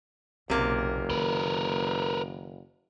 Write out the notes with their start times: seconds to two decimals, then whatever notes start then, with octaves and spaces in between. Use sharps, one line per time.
0.50 F#1 B1 C3 A#3 C#4
1.10 D#3 A#4 B4